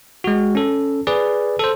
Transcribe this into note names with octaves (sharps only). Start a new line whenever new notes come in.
G#3 F#4
C#4 A4
G#4 B4 D5
A4 C5